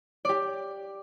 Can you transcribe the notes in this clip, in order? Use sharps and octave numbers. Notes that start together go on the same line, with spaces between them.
G4 D5